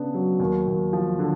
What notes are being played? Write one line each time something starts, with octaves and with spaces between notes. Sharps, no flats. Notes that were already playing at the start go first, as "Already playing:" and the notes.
Already playing: C#3 B3 D4
F#3
D#2
D#2
F3
D3